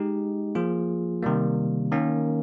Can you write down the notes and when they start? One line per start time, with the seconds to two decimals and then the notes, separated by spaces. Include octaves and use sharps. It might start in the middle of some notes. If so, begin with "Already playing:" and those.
Already playing: G#3 D#4 G4
0.55 F3 A#3 F4 G#4
1.23 C3 D#3 G3 A#3
1.92 D#3 A#3 C#4